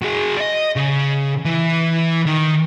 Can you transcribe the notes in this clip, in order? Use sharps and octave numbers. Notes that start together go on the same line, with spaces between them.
F#3 G#4
D5 D#5
C#3
E3
D#3